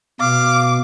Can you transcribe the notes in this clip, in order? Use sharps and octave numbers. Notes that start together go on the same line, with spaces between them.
B2 F5 D6